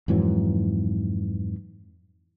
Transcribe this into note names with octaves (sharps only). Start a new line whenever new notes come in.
F2 G#2 E3 F#3